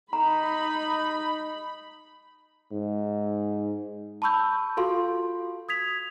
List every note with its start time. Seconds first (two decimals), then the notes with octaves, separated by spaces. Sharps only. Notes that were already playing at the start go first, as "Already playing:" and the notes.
0.13 D#4 A#5 B5
2.72 G#2
4.22 A5 B5 C#6 E6 G6
4.77 F4 F#4 A4 F5 C6
5.69 D#6 G#6 B6 F7